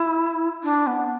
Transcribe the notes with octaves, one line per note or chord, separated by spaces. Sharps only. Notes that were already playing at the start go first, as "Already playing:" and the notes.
Already playing: E4
D4
B3